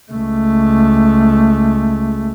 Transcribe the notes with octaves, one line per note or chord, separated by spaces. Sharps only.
C#2 A3